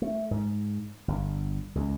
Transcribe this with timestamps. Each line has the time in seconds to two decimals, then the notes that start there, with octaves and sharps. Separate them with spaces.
0.02 A3
0.31 G#2
1.08 G1
1.75 C#2